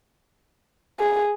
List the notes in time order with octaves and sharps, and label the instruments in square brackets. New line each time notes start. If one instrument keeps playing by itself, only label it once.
[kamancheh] G#4